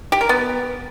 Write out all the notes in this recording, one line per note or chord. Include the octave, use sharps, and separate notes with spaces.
G4
A#4
B3